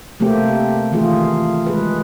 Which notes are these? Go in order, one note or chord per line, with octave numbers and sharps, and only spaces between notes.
C3 A3 A#3 C4 G4
D#3 E3 A3 F4 G#4
G#3 G#4 B4